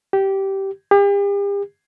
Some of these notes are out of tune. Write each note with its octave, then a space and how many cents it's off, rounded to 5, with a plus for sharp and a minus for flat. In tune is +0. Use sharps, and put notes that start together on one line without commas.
G4 -15
G4 +40